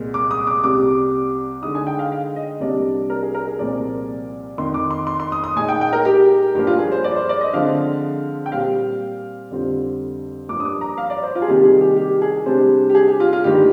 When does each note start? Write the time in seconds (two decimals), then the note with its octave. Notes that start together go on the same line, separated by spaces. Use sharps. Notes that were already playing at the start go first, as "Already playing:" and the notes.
Already playing: C2 A#2 G#3
0.14 D6
0.31 D#6
0.47 D6
0.63 C2 C3 G3 D6
1.62 D3 G#3 D#4 D#6
1.75 G#5
1.87 G5
1.99 F5
2.12 F5
2.36 D#5
2.60 C2 C3 G3 A#3 D4 D5
3.10 A#4
3.23 G#4
3.35 A#4
3.47 G#4
3.59 C2 A#2 F3 C4 D5
4.58 F2 D#3 A#3 C6
4.74 D6
4.91 C6
5.07 C6
5.20 C6
5.32 D#6
5.44 D#6
5.56 A#2 G#3 D#4 G#5
5.69 G5
5.81 G5
5.93 A#4
6.05 G4
6.55 G2 F3 A#3 G4
6.67 F4
6.79 G#4
6.92 C5
7.04 D5
7.16 C5
7.29 D5
7.41 D#5
7.53 D3 F3 G#3 C4 F5
8.46 G5
8.51 A#2 G3 C4 F5
9.51 F2 D3 G3 C4 F4
10.49 G2 F3 A#3 D6
10.60 D#6
10.65 D6
10.81 A#5
10.98 F5
11.10 D5
11.23 C5
11.35 F4
11.42 G#4
11.47 C3 D#3 G3 A#3 G4
11.64 G#4
11.80 G4
11.96 G4
12.22 G#4
12.46 C3 G3 D4 C5
12.90 G4
12.95 G#4
13.07 G4
13.20 F4
13.33 F4
13.44 G2 D#3 A#3 G4